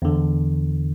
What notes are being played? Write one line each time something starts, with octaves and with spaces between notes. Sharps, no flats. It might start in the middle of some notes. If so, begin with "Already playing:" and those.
E2 D3